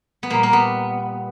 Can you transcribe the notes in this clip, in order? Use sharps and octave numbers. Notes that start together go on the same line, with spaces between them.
B3
A#2 G3 A#3
A#3
B3